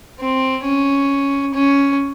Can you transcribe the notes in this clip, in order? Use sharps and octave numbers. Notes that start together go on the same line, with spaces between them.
C4
C#4
C#4